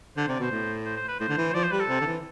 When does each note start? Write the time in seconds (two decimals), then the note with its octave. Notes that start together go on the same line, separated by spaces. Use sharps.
0.16 D3 C5
0.28 C3 D5
0.39 B2 C5
0.51 A2
0.85 C5
0.96 C5
1.08 B4
1.20 A2 C5
1.29 D3
1.37 E3
1.49 C5
1.54 F3 D5
1.63 C5
1.71 G3 B4
1.80 A4
1.88 C3
2.01 D3
2.06 E3